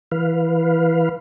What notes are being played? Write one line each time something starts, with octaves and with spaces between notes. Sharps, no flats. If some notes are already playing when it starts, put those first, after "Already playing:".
E3 B4 F5